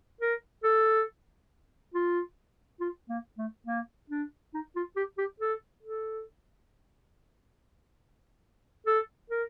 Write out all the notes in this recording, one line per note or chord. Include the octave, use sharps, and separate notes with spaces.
A#4
A4
F4
F4
A#3
A3
A#3
D4
D#4
F4
G4
G4
A4
A4
A4
A#4